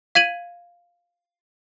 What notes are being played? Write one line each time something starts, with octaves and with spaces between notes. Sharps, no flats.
F5 G#6 D#7 F#7